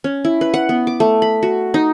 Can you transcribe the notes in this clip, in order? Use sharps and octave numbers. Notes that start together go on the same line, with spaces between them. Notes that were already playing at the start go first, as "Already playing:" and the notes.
C#4
E4
B4
F#5
B3
D6
A3
B5
F#4
D#4